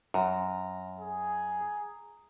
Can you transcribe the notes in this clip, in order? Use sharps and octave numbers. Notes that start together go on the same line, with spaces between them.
F#2 A#5
G#4